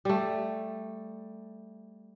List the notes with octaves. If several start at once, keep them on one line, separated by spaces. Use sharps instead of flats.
G3 A3